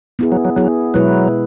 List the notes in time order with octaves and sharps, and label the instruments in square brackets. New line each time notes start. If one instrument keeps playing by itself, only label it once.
[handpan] B3 E4 G#4
[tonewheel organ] F#3
F#3
[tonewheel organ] F#3 [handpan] B3 E4 G#4
[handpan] B2 G#3 E4 B4 [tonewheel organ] F#3